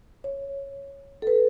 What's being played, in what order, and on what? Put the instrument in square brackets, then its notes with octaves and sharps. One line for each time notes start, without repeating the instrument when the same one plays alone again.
[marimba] C#5
A4
B4